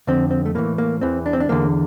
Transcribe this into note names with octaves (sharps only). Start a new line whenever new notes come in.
F2 D3 C4
C4
A3
A2 E3 A#3
A#3
E2 E3 C4
D4
C4
D4
E2 D3 A#3